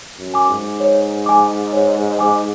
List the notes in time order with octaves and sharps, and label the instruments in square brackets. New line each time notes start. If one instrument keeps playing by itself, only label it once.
[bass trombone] F#2
[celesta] G#5 D6
[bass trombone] G#2
[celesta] C#5
G#5 D6
C#5
G#5 D6